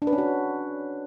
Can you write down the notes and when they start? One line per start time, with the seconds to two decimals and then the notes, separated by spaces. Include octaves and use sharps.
0.02 D4
0.07 B4
0.13 C#4
0.18 F#4